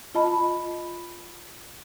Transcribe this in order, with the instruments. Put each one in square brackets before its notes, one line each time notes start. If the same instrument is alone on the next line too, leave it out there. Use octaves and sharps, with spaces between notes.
[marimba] F4 D#5 A5 B5